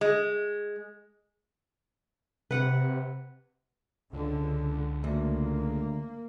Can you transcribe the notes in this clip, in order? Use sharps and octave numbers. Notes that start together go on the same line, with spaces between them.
G#3
C3 B4 F#5
C#2 D3
D2 A#3